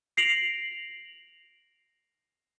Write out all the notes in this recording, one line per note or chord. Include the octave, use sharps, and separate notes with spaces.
A#6 C7 D7 F7 F#7